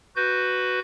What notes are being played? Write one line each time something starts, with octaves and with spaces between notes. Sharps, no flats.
F#4 B4 G6